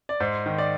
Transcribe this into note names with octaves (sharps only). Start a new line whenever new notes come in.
D5
G#2 C5
D#3
D5